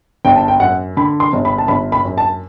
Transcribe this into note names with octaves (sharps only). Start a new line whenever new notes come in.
G1 G5
A5
G5
F#2 F#5
D3 B5
C6
G1
B5
A5
G1 B5
B5
F#2
A5